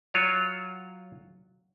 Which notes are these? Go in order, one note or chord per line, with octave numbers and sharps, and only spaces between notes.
F#3 F4 C#5